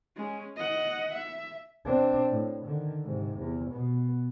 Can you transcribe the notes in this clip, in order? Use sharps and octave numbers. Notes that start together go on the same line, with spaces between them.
G#3 C#4
D#5 F#5
E5
C4 D4
A2
D3 D#3
G#2 C3
E2
B2 B3